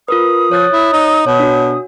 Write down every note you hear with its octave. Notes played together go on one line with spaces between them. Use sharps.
F4 A#4 B4 D#6
F3 C#5 F#6 A6
E4
D#4
B2 C#5
D4 F#4